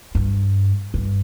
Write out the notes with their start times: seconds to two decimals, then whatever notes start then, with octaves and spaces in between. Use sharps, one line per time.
0.15 G2
0.94 G2